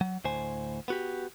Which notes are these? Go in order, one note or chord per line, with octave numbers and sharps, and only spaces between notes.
F#3
D2 A2 C5 G#5
B3 F#4 G4